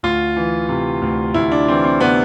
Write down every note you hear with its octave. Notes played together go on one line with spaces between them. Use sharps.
D2 F4
E3
C3
D2
D2 E4
D4
E3 C4
C4
C3 B3